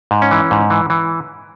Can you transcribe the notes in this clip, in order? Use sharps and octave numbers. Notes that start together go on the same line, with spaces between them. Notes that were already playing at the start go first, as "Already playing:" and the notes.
G#2
C#4
E3
G#2
E3
E3